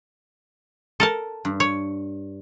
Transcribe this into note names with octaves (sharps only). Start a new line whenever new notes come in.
A4 A#4 A5
G2
C#5